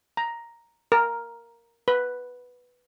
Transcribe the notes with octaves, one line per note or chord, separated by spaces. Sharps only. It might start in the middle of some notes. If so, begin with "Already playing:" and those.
A#5
A#4
B4